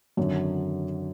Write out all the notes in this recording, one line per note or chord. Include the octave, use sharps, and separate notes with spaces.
G#1 F#2 D3 F#3